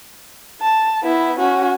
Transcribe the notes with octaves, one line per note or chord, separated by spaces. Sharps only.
A5
B3 E4
C#4 F#4